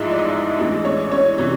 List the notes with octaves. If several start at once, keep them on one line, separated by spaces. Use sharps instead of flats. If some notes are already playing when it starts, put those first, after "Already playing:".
Already playing: A1 G#2 F3 G#3 E4 E5
D5
D#4 D#5
A1 A2 E3 G#3 D4 D5
C#4 C#5
C#4 C#5
C3 E3